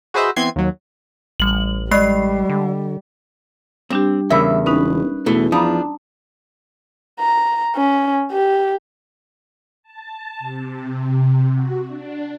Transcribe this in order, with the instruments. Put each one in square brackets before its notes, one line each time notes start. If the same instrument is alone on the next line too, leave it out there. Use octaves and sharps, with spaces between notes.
[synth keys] F#4 G#4 B4 C5 D#5 E5
E3 B3 C4 C6 G#6 C7
D#2 F#3
[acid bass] A1 [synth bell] G3 F#7
[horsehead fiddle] G3 [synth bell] G#3 B5 C7 [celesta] D5 D#5
[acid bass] D3
[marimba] G3 D4 G4 [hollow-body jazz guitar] C4
[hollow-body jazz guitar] E2 C#3 [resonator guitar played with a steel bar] G3 E5 [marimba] A#4
[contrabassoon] E1 [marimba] C#4 D#4 [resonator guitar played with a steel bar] B4
[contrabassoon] E2 [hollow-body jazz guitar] B2 E3 A3
[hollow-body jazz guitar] F3 [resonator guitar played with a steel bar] D4 [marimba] A#5 B5 D#6
[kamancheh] A#5
C#4
G4
[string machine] A5
C3
F#4
D4